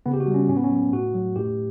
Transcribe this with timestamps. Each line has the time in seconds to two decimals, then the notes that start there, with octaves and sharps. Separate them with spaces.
0.06 C#3 B3
0.13 G4
0.20 F#4
0.27 G3
0.34 C#4
0.49 A2 C#4
0.57 B3
0.64 C#4
0.71 F#3
0.92 A2 F#4
1.14 F#3
1.36 A2 G4